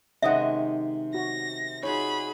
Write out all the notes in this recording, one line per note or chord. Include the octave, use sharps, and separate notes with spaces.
C3 D#3 G#3 C#4 D#5 E5 F#5
F#4 A#6
D#4 F4 F#4 G#4 C#5 B5